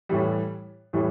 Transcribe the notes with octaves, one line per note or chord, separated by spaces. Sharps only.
A2 E3 G3
A2 E3 G3